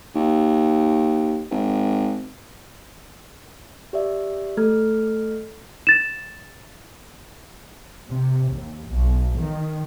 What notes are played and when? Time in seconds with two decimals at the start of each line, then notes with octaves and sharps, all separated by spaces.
0.15 D#2
1.51 G#1
3.93 G4 D5 E5
4.57 A3 A4 F6 G#6
5.87 A6 E7
8.08 C3
8.50 D#2
8.86 B1
9.38 D#3